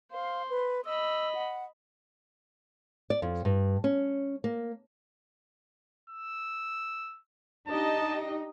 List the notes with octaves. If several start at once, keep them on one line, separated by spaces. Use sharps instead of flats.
C5 F5
B4
D#5 B5 E6
F#5
D5
F2
G2
C#4
A#3
E6
D4 D#4 G4 D#5 A5